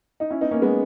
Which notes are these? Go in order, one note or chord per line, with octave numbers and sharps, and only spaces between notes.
D#4
C#4 E4
B3 D#4
A#3 C#4
G#3 B3